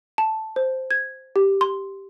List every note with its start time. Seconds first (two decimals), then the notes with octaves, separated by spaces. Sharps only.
0.18 A5
0.56 C5
0.91 G#6
1.36 G4
1.61 C6